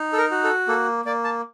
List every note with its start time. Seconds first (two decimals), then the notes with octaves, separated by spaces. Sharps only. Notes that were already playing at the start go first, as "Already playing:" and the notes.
Already playing: D#4
0.13 A4
0.18 A#4
0.31 F#4
0.44 A4
0.68 A#3 A4
1.05 A#3 D5
1.24 A5